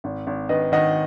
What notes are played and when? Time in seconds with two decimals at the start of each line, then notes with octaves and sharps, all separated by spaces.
0.04 G#1
0.27 G#1
0.49 D#3 B4 D#5
0.72 D#3 D#5 F#5